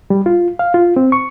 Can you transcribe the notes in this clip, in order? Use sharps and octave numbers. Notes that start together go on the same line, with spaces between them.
G3
F4
F5
F4
C4
C#6